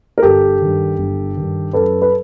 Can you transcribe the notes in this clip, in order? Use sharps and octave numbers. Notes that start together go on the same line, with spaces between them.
A#4
G1 G4 A4
G2 D#3
G1
G2 D#3
F#2 A4 B4
B4